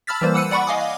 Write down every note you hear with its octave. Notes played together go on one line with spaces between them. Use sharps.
A5 B5 E6 F6 A6 B6
E3 G3 A#3 C5
F#5 E6 F#6 C#7 D#7
D5 F#5 B5 C#6
D#5 F5 G#5 D6 D#6